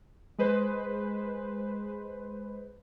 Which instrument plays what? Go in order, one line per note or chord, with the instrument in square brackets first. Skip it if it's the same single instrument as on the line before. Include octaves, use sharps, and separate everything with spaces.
[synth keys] G#3 B4 C5